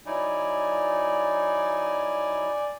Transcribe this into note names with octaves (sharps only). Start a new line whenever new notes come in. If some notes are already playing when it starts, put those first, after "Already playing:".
F#3 D#4 E4 D5 G#5